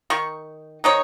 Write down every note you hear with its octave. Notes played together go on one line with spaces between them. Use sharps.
D#3 C#6
D#3 D#4 C#5